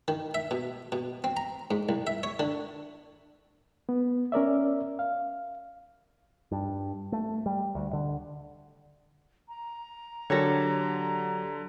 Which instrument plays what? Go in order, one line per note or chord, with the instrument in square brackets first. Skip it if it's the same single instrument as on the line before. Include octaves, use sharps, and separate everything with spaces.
[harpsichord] D#3
E5
B2
B2
C4
A#5
G#2
C2
E5
C#5
D3
[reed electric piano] B3
C#4 A#4 D5 E5
F5
[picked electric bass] G2
A3
G3
D2
D3
[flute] A#5
[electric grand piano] D3 [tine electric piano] F#3 G4 A#6 [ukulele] A4 A#4 C#5